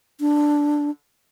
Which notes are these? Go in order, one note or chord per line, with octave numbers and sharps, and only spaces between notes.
D4